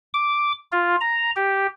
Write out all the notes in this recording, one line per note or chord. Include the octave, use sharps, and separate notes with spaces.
D6
F4
A#5
G4